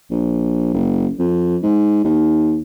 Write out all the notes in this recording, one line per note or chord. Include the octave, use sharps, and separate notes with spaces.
A#1
F#1
F2
G#2
D#2